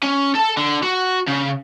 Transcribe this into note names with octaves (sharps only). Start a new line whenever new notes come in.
C#4
A4 A5
D3
F#4
C#3